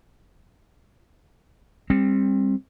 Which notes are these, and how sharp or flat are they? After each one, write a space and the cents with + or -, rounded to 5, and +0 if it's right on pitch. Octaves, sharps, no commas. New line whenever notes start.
G3 +30 C4 +20